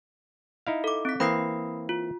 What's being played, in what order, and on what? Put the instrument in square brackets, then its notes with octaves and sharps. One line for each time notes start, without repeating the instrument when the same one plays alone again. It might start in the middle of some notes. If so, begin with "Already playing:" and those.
[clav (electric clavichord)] D#4 E4 F5
[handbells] A4 D6
C4 B6
[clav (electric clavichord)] E3 A#3 C4 [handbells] B5 D#6 C7
[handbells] F4